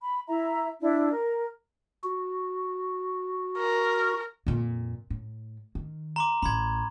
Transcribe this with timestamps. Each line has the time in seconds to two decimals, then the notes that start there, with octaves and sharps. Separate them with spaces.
0.01 B5
0.28 E4 E5 A#5
0.81 D4 E4
1.12 A#4
2.04 F#4
3.58 A#4
4.47 F2 A#2
5.10 A2
5.75 D#3
6.16 A#5 C6 D6
6.42 A1 A3 B5 C6 G#6